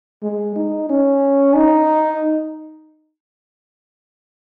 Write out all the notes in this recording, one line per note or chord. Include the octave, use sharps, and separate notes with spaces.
G#3
D#4
C#4
D#4